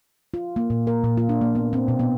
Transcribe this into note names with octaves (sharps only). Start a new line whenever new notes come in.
F4
A#3
A#2
A#4
A#2
F4
D4
A#3
B3
C4
B2
B3